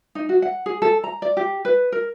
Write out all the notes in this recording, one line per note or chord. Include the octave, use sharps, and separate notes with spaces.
D#4
F#4
F#5
G#4
A4
A#5
D5
G4
B4
A#4